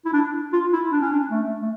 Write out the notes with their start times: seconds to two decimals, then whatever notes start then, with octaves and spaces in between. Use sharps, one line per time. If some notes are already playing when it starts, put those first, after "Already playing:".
0.05 E4
0.13 D4
0.53 F4
0.73 E4
0.92 D4
1.02 C#4
1.12 D4
1.31 A3
1.61 A3